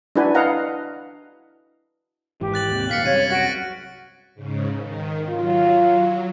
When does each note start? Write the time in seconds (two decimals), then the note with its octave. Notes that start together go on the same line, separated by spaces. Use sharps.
0.16 D4 E4 F#4 B4 G#5 B5
0.35 B4 D#5 F5 F#5 A#5
2.41 G#1 G#2 E3 G4
2.54 F#6 A6 F#7
2.70 D#2 G#2 C3
2.89 D#2 A#2 D#3 F5 F6 B6 C#7
3.06 C2 F#2 C3 C#5 D#7
3.30 F#4 A6 D7
4.35 G#2 C#3
4.78 D#3
5.30 F#3 F4